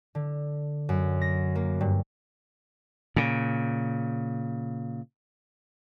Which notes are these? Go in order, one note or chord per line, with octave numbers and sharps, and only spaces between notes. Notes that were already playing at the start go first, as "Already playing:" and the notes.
D3
F#2
A#6
A#3
G2
A#2 C#3